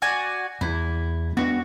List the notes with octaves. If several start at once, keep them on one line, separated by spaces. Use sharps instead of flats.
F#4 D5 G#5
E2 E4
B3 C4 D4 F#4